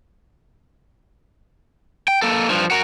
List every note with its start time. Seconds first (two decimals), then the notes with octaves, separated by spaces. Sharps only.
2.08 G5
2.22 A#3 A4
2.49 G2 F3
2.71 F#4 A#4